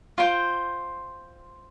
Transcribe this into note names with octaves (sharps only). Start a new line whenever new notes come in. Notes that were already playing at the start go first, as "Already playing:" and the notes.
F4 C5 G5